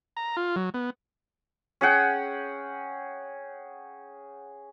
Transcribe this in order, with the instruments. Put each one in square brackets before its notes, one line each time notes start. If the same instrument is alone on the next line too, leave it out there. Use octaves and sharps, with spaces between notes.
[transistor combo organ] A#5
F4
F#3
B3
[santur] C#4 G#4 F#5 G5